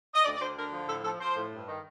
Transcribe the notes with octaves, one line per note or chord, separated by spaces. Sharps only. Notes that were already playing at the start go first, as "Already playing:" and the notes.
D#5
D2 D5
D5
D2 C5
D3 A#4
F3
A2 A4
F3 A4
F3 C5
A2
G2
D#3